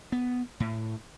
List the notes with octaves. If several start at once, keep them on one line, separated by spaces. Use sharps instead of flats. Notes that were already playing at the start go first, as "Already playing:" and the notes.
B3
A2